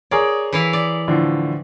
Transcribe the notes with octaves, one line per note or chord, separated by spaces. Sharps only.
G#4 A#4 C#5 D5
E3 E4 F5
D5
A2 D3 F3